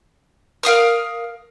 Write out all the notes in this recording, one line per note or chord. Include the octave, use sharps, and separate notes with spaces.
A#4 F5 D#6 F6